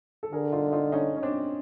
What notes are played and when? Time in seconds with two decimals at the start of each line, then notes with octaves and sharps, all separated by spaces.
0.23 A4
0.32 D3 G#4 A#4
0.52 D#4 F4
0.72 D#4 F4
0.92 C#4 D#4
1.16 C#4
1.23 C4 D4